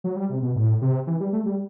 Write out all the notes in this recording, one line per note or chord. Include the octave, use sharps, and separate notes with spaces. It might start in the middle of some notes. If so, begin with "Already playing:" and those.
F#3
G3
C3
B2
A2
C3
E3
G3
A3
G3